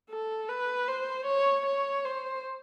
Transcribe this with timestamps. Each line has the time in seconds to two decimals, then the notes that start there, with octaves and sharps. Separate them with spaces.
0.10 A4
0.49 B4
0.88 C5
1.26 C#5
1.66 C#5
2.05 C5